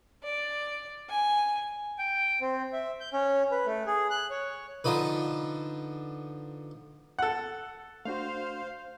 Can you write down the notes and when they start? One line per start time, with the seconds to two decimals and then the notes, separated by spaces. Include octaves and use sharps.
0.24 D5
1.10 G#5
1.99 G5
2.41 C4
2.73 E5
3.00 G6
3.13 C#4
3.51 B4
3.66 A3
3.86 G#4
4.10 F#6
4.30 C#5
4.84 D3 F3 D#4 B4
7.19 A4 F#5
8.05 A3 D4 F#4 C5 F5